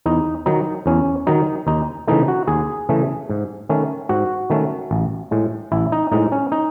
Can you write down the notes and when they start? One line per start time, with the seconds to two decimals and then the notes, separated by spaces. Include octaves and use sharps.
0.06 E2 D#4
0.46 D#3 F#3 D#4
0.86 E2 C#4
1.27 D#3 F#3 D#4
1.67 D#2 D#4
2.07 C#3 E3 A3 D#4
2.28 F#4
2.47 D#2 G#4
2.89 C#3 E3 A3
3.29 G#2
3.69 D#3 A3 C#4
4.09 G#2 F#4
4.50 D#3 A3 C#4
4.91 A1
5.31 A2 G#3
5.72 A1 E4
5.92 D#4
6.12 A2 G#3 D#4
6.32 C#4
6.52 D#4